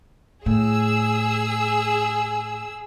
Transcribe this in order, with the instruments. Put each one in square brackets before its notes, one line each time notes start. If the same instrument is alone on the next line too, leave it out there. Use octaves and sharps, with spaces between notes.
[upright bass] A2 [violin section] G#4 E6